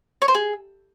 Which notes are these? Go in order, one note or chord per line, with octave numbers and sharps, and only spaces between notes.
C#5
C5
G#4